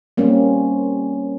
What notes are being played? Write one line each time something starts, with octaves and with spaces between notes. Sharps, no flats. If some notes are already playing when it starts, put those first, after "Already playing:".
G3 A#3 C4 C#4